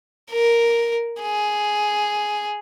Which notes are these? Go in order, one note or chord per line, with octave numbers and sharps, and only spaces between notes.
A#4
G#4